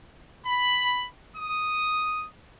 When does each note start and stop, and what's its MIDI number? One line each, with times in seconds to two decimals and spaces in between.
0.46 1.06 83
1.37 2.26 87